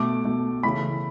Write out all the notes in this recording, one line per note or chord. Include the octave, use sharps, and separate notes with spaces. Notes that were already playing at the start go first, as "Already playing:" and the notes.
Already playing: B2 A3 D6
B2 A3
C#3 E3 A3 B5